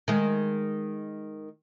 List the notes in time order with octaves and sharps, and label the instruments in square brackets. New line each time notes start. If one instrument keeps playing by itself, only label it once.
[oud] D#3 G#3